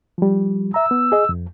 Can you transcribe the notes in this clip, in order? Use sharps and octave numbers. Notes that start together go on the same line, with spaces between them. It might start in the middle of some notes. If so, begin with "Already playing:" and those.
F3 G3
E5 A#5 E6
B3
G#4 D#5
F2